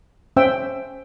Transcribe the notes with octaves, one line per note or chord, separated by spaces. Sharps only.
C#4 C5 E5 G5 E6